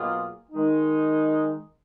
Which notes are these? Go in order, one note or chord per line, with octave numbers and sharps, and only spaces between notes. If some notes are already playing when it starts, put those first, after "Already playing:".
Already playing: B2 F#3 A#3 F4 G#4
D#3 G#3 D#4